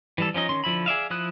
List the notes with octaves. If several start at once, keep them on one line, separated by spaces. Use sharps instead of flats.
E3 G3 A4
F3 C#4 D#4 D#5
D#3 C#4 C6
D3 F3 E4 B5
G#4 D5 E5 F5
F3 E4 D#6 F#6